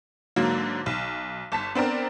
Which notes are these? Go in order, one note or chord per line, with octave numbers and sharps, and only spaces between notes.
G#2 D3 F#3 A#3
B1
G1 A5 B6
B3 C4 D4 A#4